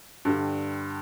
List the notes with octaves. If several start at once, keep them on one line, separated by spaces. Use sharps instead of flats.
G2 D3 G3